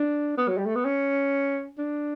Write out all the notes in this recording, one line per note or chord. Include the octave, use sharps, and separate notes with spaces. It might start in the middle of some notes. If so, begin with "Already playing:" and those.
Already playing: D4
B3
F#3
G3
A3
B3
C#4
D4